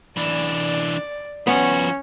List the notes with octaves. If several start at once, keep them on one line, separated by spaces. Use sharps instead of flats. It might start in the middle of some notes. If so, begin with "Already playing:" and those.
E3 D4 D5
F3 B3 C#4 F#4